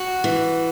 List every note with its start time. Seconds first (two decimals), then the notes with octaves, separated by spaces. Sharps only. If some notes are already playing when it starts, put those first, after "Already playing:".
Already playing: F#4
0.24 E3